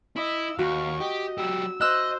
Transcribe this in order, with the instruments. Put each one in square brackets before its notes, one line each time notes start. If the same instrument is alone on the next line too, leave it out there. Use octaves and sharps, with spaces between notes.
[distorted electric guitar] E4 [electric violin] D#5 E6
[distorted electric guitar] D#2 [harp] F#4 [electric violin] F5 C#6
[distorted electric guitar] G4 [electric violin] D#5
[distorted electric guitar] F#3 G4 [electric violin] E6
[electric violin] C5 [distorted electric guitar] D#5 [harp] E6 F#6